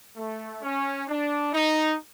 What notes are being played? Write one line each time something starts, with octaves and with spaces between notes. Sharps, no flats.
A3
C#4
D4
D#4